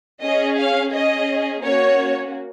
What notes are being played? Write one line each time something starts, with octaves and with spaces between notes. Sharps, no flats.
C#4 G#4 D#5
F5
C#4 G#4 D#5
A#3 C#4 F#4 C#5